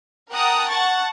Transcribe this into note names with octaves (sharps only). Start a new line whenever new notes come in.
A#4 F#5 G5 A5 A#5 D#6
F#5 A5 C#6 A6